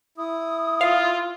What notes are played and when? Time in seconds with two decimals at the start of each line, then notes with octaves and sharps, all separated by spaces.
0.18 E4 D#6
0.81 F4 F5